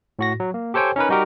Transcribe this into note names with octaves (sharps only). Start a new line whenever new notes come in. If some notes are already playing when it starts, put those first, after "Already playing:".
A2 F#4 A#6
F#3
A#3
G4 A4 C5 C#5 G5 G#5
C#4 D#4 A#4 B4
G3 D#4 F#4 G4 A#4